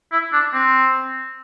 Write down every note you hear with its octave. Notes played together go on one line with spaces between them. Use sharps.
E4
D4
C4